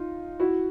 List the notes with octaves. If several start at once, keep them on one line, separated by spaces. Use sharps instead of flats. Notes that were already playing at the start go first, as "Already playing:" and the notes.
Already playing: D#4 F4
E4 F#4